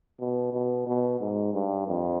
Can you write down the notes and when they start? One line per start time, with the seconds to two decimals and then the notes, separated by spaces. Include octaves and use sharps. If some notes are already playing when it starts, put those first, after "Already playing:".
0.20 B2
0.53 B2
0.87 B2
1.20 G#2
1.53 G2
1.87 F2